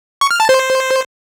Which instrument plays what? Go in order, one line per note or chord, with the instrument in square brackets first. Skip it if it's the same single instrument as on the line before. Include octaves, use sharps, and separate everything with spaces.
[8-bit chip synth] C#6
F6
A5
C5